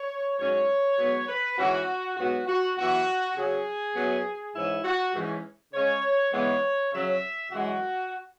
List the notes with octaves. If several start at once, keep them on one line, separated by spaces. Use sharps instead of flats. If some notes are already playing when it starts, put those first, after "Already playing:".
Already playing: C#5
G#2 F#3 C#4 C#5
G#2 F#3 B3
B4
G#2 E3 C#4 F#4
G#2 F#3 B3 F#4
F#4
F#2 E3 B3 F#4
C#3 F#3 C#4 G#4
F#2 F#3 B3
G#2 E3 C#4 E4
F#4
G#2 E3 C#4
C#3 G#3 C#4 C#5
C#3 E3 G#3 B3 C#5
C#3 F#3 C#4 E5
F#2 E3 G#3 F#4